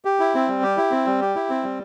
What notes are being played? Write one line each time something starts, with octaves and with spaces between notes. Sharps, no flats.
G4
E4
C4
G3
G4
E4
C4
G3
G4
E4
C4
G3